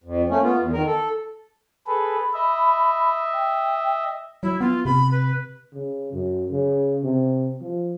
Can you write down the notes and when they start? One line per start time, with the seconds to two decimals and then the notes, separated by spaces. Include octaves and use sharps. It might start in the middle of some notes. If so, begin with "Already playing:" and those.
0.04 F2
0.29 A3 A#3 C#4
0.42 B3 F4
0.59 E2
0.73 D#3 A#4
0.86 A4
1.87 G#4 A4 B4 B5
2.33 D#5 E5
3.33 G5
4.43 F#3 E4
4.61 B3 F4
4.85 C3 B5
5.11 B4
5.74 C#3
6.13 F#2
6.52 C#3
7.04 C3
7.61 F3